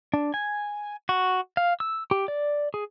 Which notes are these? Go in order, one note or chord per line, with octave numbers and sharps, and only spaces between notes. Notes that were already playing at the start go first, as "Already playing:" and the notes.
D4
G#5
F#4
F5
E6
G4
D5
G#4